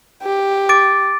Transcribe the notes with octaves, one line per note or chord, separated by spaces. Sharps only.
G4
D6 A6 D7